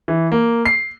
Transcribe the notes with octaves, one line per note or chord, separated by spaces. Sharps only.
E3
A#3
C7